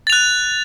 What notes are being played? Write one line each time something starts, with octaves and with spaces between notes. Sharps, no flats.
F#6 A6 F7